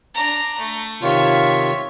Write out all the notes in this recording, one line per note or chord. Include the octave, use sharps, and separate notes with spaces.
D4 A#5
A3
C3 D#3 F4 C#5 E5